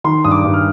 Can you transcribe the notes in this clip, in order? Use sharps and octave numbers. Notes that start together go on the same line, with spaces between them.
D#3 C6
G2 D#6
D6
G2
F6